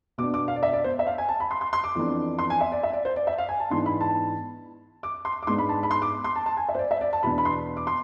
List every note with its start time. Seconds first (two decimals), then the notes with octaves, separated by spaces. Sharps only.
0.18 B2 B3 D4 D6
0.34 D6
0.48 F5
0.56 D5
0.63 E5
0.73 D5
0.84 C5
0.99 E5
1.07 F5
1.18 G#5
1.29 A5
1.40 B5
1.51 C6
1.61 C6
1.73 C6
1.84 D6
1.95 F2 E3 B3 D4
2.39 C6
2.50 G#5
2.61 E5
2.72 D5
2.83 E5
2.93 D5
3.05 C5
3.16 D5
3.27 E5
3.38 F5
3.49 G#5
3.60 A5
3.70 G#2 E3 B3 D4 C6
3.86 B5
4.01 A5
5.03 D6
5.25 C6
5.43 D6
5.47 G#2 G#3 B3 D4 C6
5.58 B5
5.69 A5
5.83 B5
5.91 C6
6.02 D6
6.24 C6
6.36 A5
6.46 A5
6.57 G#5
6.69 E5
6.75 C5
6.79 D5
6.91 E5
7.01 D5
7.13 A5
7.23 E2 B2 B3 D4 B5
7.38 B5
7.45 C6
7.77 D6
7.87 C6